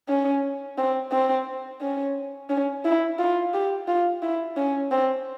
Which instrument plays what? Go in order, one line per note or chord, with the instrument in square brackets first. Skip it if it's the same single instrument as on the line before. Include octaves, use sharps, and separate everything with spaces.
[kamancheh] C#4
C4
C4
C#4
C#4
E4
F4
G4
F4
E4
C#4
C4